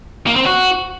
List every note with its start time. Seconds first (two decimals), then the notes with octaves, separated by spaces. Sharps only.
0.27 A#3
0.36 C4
0.46 F#4